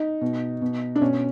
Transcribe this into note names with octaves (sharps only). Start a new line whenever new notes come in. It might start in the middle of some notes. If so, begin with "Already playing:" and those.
Already playing: D#4
B2
B2
D4
B2 C#4